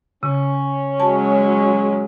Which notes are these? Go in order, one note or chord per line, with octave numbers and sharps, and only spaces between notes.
C#3 C#4
F#3 G#3 A5